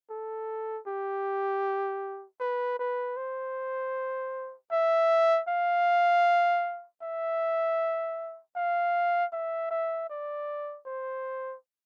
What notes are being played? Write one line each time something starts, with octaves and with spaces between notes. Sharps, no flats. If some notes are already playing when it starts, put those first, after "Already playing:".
A4
G4
B4
B4
C5
E5
F5
E5
F5
E5
E5
D5
C5